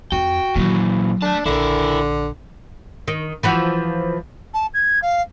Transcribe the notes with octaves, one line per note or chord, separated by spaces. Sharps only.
F2 F#4 G5
A#2 D#3 E3 F#3
A3 D4 A5
A#1 D3 E4 A#4
D#3
E3 F3 F#4
A5
G#6
F5